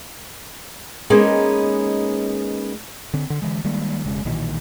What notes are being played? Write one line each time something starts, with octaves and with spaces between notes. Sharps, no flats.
G#3 A#3 B3 C#4 D#4 G#4
D3 C4
D3
D3 E3 G#3
D#3 G3 G#3 A#3
E1 C#3 G#3
B1 A#2 D#3 E3